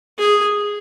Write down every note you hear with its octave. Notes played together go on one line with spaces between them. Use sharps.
G#4